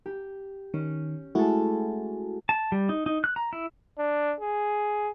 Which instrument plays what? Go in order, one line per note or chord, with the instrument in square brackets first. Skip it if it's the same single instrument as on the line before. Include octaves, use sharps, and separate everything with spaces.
[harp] G4
[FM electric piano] D#3 [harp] C#4
[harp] G#3 G#4 A4 [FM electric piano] A3 E4 F#4
[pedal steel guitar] A5
G3
D#4
D#4
F#6
A#5
E4
[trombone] D4
G#4